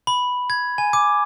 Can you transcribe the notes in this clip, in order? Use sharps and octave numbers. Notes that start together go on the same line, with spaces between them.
B5
G#6
G#5
D6